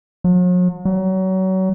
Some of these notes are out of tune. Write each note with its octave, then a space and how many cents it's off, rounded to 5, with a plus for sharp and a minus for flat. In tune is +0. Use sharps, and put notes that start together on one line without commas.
F#3 -45
F#3 +30